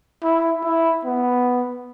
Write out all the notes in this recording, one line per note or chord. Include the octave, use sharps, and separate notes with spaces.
E4
E4
B3